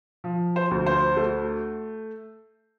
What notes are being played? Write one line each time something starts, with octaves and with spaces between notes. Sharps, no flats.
F3
C5
D2
C5
A3